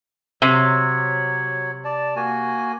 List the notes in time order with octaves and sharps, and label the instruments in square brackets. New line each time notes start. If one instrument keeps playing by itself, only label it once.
[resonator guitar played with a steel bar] C3 [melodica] F#3 C#5
[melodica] D5 A5
A#3 F#4 G#5